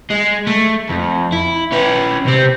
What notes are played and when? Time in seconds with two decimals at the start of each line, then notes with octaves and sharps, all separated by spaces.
0.10 G#3
0.47 A3
0.89 F2
1.32 E4
1.72 C#4 B4
2.26 C3 C4